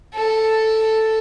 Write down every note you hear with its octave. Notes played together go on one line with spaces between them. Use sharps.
A4